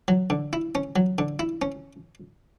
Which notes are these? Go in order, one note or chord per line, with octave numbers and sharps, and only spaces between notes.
F#3
D3
E4
C#4
F#3
D3
E4
C#4